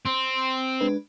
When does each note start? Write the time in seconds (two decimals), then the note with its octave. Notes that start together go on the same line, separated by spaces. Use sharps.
0.05 C4
0.81 G#3 D4 B4